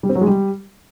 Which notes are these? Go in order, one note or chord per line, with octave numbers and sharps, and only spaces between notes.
G3
C4
F#3
G#3
G3